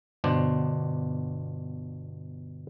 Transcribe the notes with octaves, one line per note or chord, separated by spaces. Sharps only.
G1 B2 D4 C5